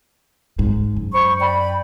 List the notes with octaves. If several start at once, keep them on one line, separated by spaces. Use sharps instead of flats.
G#2
F#2
C5 B5 C#6
D5 G5 B5